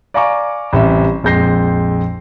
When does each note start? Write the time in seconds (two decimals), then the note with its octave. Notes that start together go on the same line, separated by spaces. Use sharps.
0.14 D5 F5 G#5 A#5 C#6 D6
0.73 A1 C3 G3 E5
1.23 A#1 F2 G#3 G6 A#6 C7